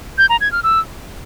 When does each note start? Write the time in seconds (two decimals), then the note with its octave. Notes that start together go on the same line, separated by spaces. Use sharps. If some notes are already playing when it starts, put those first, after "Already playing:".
0.18 G6
0.29 A#5
0.41 G#6
0.52 F6
0.63 E6